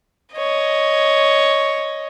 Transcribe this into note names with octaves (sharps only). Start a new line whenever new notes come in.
C#5 D#5